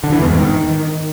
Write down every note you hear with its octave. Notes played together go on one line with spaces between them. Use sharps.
D3
E3
E2
G#2
D#3